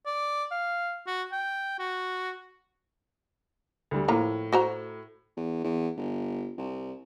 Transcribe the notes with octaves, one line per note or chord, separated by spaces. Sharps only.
D5
F5
F#4
G5
F#4
D2 G3
A2 F3 A#3 A#5
F#4 C5 A#5
E2
E2
G1
C2